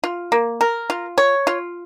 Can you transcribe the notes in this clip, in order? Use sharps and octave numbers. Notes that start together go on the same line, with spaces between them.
F4
A#3
A#4
F4
C#5
F4